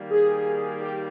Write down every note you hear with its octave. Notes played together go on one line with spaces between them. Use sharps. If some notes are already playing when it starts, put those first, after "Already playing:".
Already playing: D#3 G3 A#3
G#4
G4